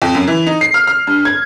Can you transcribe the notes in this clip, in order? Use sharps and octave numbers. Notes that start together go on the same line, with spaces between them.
F2
F#2
E3
D#4
C7
F6
F6
G2
G#6